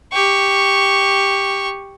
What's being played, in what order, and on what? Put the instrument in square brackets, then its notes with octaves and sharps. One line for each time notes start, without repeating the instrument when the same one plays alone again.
[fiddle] G4 C#6